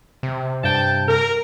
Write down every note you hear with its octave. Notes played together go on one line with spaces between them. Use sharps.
C3
G2 G5 A5
A#4